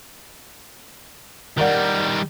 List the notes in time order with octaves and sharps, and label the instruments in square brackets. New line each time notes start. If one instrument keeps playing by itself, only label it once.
[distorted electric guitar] D#3 G3 [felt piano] A#4 D5 F#5